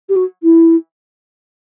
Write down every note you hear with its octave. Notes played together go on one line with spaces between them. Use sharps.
G4
F#4
E4